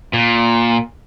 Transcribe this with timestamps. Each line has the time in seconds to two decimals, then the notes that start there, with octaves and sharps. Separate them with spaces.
0.13 A#2